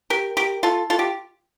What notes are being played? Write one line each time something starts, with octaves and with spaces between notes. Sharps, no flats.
G4 A#4
G4 A#4
F4 A4
F4 A4
G4